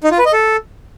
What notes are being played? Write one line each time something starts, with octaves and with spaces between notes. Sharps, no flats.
D#4
F4
B4
D#5
A4